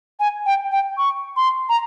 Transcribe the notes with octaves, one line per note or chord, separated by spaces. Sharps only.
G#5
G5
G5
C#6
C6
A#5